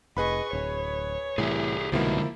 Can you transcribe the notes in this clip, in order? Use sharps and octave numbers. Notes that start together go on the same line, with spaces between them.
F1 G#4 B4 D#5 B5 C#6
D1 C#5
C2 A2 E3 G4 G#4
C2 B2 D3 F3 G#3 A#3 D#4 E4